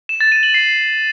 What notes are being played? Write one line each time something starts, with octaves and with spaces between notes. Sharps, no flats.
E7
A6
D#7
F#7
C7